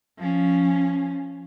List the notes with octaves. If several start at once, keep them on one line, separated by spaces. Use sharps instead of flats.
F3 C#4